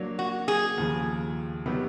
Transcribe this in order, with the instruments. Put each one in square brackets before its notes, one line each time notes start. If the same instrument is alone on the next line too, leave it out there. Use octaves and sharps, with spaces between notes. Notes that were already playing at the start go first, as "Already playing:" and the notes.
Already playing: [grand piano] F#3 A#3 D4
[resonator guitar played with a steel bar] F#4
G#4
[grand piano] D#2 C#3 F3
C3 D#3 F#3 B3